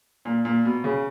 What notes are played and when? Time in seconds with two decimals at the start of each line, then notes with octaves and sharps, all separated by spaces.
0.25 A#2
0.45 A#2
0.65 B2
0.84 C#3